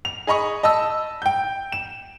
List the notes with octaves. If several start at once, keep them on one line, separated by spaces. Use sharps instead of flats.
F7
G#4 D#5 B5 C#6
D#5 A5 B5 E6
G5 G6
E7